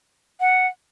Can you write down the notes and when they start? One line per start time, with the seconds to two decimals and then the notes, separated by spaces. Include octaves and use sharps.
0.40 F#5